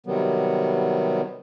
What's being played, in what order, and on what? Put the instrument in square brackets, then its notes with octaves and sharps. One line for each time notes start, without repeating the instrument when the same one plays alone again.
[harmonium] C3 D#3 F#3 G3 B3